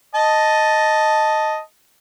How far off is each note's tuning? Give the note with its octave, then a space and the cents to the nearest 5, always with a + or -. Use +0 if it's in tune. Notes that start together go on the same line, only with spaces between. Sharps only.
D#5 +0 A5 +0